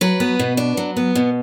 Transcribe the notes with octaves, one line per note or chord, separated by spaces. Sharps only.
F#3 B4
B3
B2
D4
F#3
B3
B2